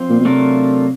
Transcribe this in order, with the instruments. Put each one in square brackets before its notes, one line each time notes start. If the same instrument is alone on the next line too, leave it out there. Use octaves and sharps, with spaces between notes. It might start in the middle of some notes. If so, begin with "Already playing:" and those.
Already playing: [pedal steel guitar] F3 C4
[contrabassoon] A#2
B2
[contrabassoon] C3 [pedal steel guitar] F#3 A3 D4 F4 A#4